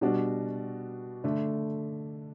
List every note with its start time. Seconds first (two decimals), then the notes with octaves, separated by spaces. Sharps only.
0.01 B2 G3 D4 F#4
1.24 D3 A3 D4